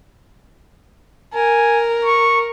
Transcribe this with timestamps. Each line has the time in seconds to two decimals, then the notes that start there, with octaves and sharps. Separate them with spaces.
1.34 A#4 G#5
2.05 C#6